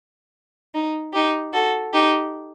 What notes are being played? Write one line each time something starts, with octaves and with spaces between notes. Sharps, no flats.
D#4
D#4 G4
F#4 A4
D#4 G4